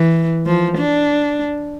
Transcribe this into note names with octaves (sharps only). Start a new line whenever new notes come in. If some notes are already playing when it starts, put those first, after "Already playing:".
Already playing: E3
F3
D4